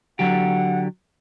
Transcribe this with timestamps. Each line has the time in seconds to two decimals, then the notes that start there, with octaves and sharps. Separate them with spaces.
0.19 D3 F#3 G4 F#5